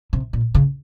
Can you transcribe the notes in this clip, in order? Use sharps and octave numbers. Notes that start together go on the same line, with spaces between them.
C3
A#2
C#3